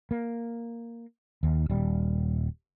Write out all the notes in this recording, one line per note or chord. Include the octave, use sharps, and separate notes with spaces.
A#3
D#2
D#1 G3